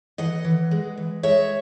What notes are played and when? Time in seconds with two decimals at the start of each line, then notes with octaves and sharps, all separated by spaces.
0.18 E3 D#5 F#5
0.44 E3
0.71 G#3
0.97 E3
1.23 G#3 C#5 E5